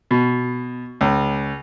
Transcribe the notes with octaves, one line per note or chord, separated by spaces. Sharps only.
B2
C#2